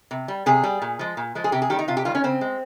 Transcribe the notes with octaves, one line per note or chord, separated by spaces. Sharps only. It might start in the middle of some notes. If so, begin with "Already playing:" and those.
C3
G3
C3 G#4
G3
A#2
F3 G#3
A#2
F3 G#3
G#4
C3 G4
G#4
D#3 G3 G4
D#4
C3 F4
G4
D#3 G3 F4
C#4
C#3 C4
G#3